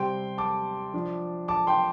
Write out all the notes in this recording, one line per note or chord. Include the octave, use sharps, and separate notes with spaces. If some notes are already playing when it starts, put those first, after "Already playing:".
Already playing: C3 G3 C4 G5 C6
A5 D6
F3 D4
A5 D6
G5 C6